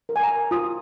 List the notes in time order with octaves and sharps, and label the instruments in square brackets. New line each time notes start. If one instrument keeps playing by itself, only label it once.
[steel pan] A#4
G#5
A#5
F4 D#6